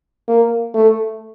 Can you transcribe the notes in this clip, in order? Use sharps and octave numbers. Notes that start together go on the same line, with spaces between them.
A#3
A3